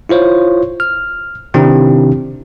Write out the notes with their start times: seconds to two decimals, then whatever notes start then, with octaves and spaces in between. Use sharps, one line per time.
0.09 E4 F4 C5 C#5
0.80 F6
1.54 C3 D#3 C4 D4 E4 G4